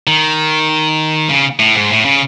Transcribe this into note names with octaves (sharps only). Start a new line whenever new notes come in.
D#3
C#3
A2
G#2
A2
C#3